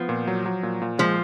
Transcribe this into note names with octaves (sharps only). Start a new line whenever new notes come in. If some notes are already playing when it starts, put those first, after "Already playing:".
Already playing: F3 B3
A#2
F#3
F#3
A#2
A#2
F3 G#3